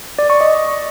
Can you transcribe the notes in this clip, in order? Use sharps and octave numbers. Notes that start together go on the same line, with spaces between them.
D5
C#6
D#5